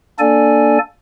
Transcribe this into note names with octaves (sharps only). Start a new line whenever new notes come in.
A#3 D4 A4 D5 G#5